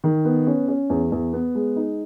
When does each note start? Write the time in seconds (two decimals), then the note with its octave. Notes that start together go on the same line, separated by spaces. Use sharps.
0.04 D#3
0.25 B3
0.47 C#4
0.68 C#4
0.90 E2
1.12 E2
1.33 B3
1.55 G#3
1.76 D#4